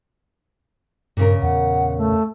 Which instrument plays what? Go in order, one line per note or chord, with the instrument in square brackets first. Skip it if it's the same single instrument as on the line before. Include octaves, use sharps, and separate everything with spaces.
[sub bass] G2 [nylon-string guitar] A#2 C#3 A#4
[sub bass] E2 [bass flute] F#5
[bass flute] A3